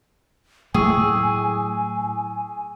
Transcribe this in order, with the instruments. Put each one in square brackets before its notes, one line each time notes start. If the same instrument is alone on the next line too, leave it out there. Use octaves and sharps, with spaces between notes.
[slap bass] A2 F#3 A3 [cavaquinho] G#4 [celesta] G5 C#6 E6 [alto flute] G#5